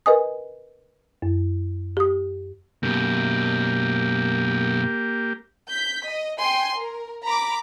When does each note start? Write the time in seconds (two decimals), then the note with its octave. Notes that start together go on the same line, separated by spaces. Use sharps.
0.06 A#4 B4 D#5 G#5 D#6
1.22 F#2
1.97 G4 D#6
2.83 F#2 B2 A#3 G4
5.71 G6 B6
6.07 D#5
6.40 G5 G#5 C6
6.78 A#4
7.24 A#5 B5 D6